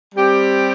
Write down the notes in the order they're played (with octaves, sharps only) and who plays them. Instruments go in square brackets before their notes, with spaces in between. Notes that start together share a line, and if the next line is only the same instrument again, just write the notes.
[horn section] G3 C4 G4